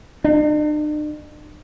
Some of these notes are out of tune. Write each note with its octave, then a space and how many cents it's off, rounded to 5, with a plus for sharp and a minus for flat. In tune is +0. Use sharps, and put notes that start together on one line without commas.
D4 +45